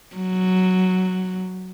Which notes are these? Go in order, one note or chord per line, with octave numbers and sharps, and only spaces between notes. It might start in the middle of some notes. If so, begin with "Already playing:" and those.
F#3